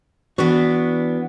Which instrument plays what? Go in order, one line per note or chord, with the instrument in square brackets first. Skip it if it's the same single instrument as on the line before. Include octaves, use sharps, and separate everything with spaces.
[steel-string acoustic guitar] E3 D4 [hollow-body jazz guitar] B3 F#4